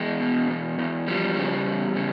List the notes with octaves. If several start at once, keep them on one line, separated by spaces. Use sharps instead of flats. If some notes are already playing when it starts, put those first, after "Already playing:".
Already playing: E2 G#3
B2
E2
E2
F3 G3
C#3
E2
C#3